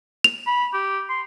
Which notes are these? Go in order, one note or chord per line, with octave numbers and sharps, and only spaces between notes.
F7
B5
G4
C6